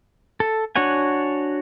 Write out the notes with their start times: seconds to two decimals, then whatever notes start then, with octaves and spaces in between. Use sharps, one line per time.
0.40 A4
0.76 D4 F#4 C#5 F#5 G#5